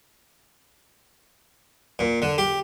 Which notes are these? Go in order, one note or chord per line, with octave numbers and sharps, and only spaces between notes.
A#2
D3
G4